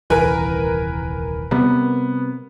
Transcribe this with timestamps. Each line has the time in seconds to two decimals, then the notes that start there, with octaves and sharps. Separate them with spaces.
0.10 D#1 C2 E3 A#4 B4 G#5
1.51 C3 G3 B3